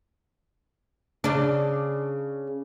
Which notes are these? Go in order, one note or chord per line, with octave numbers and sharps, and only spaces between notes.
C#3 D4